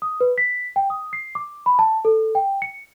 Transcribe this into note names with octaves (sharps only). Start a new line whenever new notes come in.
D#6
B4
B6
G5
D#6
C7
D6
B5
A5
A4
G5
C#7